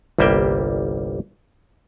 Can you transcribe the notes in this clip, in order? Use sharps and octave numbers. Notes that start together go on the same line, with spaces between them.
G1 C2 G3 A#3 E5 G5